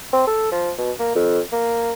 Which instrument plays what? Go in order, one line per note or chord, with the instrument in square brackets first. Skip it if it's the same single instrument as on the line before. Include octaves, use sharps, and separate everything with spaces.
[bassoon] C4
A4
F3
B2
A#3
F2
A#3